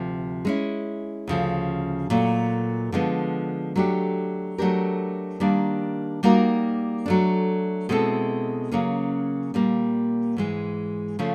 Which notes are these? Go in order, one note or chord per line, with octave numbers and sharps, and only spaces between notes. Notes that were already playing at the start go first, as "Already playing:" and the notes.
Already playing: D2 C3 F3
G#3 C#4 E4
D2 C#3 F3
A#2 F#3 A3
D3 F3 G#3 B3
F#3 A3 D4 G4
F#3 A3 D4 G4 A#4
D#3 G3 A#3 D4
G3 A#3 D#4 F#4 A#4
F#3 A3 D4
B2 G#3 C4 E4 A4
C#3 F#3 A#3 C#4
A#2 G3 A#3
G#2 E3 G#3
C#3 F3 A3